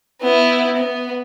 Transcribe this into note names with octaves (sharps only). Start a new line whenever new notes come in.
B3 E4
B3